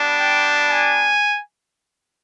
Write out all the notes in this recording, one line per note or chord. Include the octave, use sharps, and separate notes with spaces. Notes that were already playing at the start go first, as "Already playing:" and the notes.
Already playing: G3 B3 D4
G5
G#5